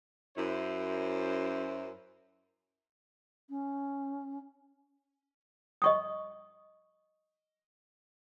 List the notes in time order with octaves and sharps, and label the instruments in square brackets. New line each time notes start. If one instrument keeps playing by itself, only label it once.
[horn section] F#2 E4 C5
[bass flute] C#4
[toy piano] D#5 C#6 D#6